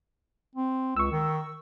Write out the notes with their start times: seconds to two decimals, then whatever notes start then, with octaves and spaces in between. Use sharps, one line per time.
0.55 C4
0.96 C#2 C#6 E6
1.12 D#3